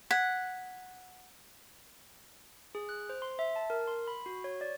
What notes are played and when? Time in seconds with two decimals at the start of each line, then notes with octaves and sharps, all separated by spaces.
0.11 F#5 G#6 B6
2.75 G#4
2.89 F#6
3.09 C5
3.22 C6
3.39 E5
3.56 A5
3.70 A#4
3.87 C6
4.08 B5
4.26 F#4
4.44 C#5
4.61 D5